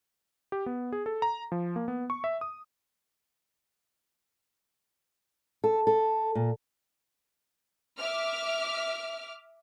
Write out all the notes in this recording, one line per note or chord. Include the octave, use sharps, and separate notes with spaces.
G4
B3
G#4
A4
A#5
F3
A#3
B3
C#6
E5
D#6
A4
A4
A#2
E5 D6 F6